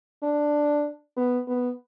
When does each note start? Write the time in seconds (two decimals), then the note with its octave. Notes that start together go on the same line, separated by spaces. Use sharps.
0.23 D4
1.17 B3
1.48 B3